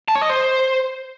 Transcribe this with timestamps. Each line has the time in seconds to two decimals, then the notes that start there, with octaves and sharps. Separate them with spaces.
0.08 A5
0.15 C#5
0.22 D#5
0.29 C5